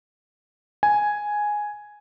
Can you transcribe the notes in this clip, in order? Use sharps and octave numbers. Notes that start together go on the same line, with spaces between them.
G#5